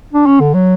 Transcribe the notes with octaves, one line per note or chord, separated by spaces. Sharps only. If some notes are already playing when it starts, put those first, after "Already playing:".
D4
C#4
D3
F#3